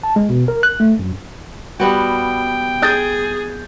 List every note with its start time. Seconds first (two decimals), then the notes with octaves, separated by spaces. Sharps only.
0.03 A5
0.16 G#3
0.29 B2
0.48 A#4
0.63 F#6
0.80 A3
0.99 F#2
1.80 G3 B3 F#4 G5
2.82 G#4 D#6 G6 A6